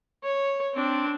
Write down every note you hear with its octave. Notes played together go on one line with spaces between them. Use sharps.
C#5
C4 D4